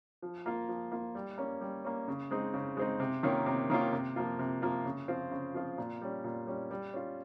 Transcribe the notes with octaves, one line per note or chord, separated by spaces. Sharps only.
F3
A#3 F4
F3
A#3 F4
G3
A#3 C#4
G3
A#3 C#4
C#3
G#3 C4 D#4
C#3
G#3 C4 D#4
C3
D#3 A#3 C#4 F4
C3
D#3 A#3 C#4 F4
C3
F3 A#3 F4
C3
F3 A#3 F4
C#3
F3 C4 F4
C#3
F3 C4 F4
A#2
G3 C#4
A#2
G3 C#4
G3
C#4 F4